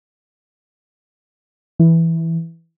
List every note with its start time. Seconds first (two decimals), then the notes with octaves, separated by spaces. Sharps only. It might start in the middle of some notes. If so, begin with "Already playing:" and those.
1.79 E3